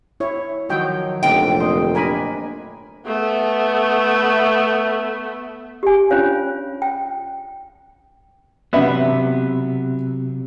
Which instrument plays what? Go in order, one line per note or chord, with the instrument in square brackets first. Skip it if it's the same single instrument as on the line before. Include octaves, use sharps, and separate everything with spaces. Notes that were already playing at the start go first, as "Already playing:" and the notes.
[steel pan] E4 C#5
[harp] D#3 F3 F#3 [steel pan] F#4 C#5 G5
[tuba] F1 [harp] A#2 D3 [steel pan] D#4 [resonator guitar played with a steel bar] G5
[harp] C5 D#5
[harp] D4 [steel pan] A#4 G#5 B5
[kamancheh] A3 B3
[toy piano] G4 G#5
C#4 D4 F4 C5 C#5 F5
G5
[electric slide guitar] C3 F#3 [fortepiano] B3 E5